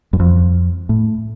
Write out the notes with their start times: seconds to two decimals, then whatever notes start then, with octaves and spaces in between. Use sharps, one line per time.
0.13 F#2
0.20 F2
0.89 A2